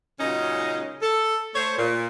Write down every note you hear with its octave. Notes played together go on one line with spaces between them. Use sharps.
A#2 C#3 F#3 G#3 C#4 D#4
A4
A3 C5 C#5
A#2